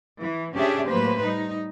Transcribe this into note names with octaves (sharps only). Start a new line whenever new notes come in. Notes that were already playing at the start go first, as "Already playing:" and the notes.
E3
C3 C#4 D4 G4 G#4 E5
A2 F#3 A#3 B4 C5
G3 D#4